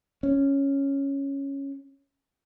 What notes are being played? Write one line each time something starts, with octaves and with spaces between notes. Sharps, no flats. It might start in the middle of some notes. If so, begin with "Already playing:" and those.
C#4